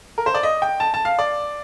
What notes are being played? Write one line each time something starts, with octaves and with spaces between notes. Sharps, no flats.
A#4
C5
D5
D#5
G5
A5
A5
F5
D5